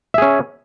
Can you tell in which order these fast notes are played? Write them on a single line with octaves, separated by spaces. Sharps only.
E5 G#4 C#4